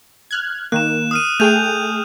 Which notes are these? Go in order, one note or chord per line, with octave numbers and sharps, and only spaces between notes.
F6 F#6 G#6
D#3 A#3 F#6 E7
D#6 F6 D#7
A3 G#4 G5 G6 D#7 F7